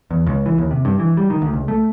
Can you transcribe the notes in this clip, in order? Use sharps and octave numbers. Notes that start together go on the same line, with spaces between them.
E2
C#2
E3
D#2
C3
G2
E3
G3
D#3
D2
C#2
A3